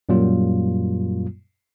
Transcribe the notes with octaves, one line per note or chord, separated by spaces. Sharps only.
F#2 A#2 F#3 G3 A#3 F4